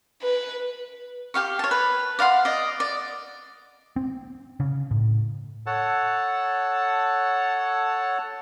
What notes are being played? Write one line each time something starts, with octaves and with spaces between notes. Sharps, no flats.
B4
G4 F5 C#6
C#5 A5
B4
D5 F5 F#5 C6
D5 D#5
D5
C4
C#3
A2
A4 C#5 F#5 A5